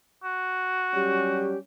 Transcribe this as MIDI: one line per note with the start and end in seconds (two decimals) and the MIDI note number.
0.23 1.54 66
0.94 1.57 54
0.94 1.57 55
0.94 1.57 61
0.94 1.58 67